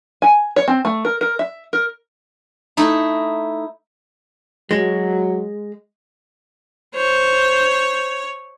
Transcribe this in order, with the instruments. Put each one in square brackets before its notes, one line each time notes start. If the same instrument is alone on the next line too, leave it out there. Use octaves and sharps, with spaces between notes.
[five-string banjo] G#5
C#5
C4
A3
A#4
A#4
E5
A#4
[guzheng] A3 D#4 E4
[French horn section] F#3 [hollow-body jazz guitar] G#3
[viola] C5 [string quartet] C#5